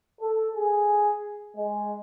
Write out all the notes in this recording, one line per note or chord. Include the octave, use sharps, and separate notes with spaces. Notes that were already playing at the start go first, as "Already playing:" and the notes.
A4
G#4
G#3